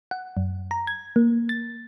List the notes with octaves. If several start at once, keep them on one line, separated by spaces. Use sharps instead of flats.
F#5
F#2
A#5
G#6
A#3
A6